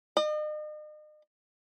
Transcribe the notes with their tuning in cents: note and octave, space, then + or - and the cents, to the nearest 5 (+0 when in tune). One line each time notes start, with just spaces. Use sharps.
D#5 -40